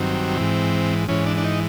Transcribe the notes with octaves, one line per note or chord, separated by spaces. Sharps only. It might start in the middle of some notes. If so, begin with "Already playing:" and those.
Already playing: G2 D#3 F#3 C4
G#2 E3
G#2 E3 C#4
D4
D4
D#4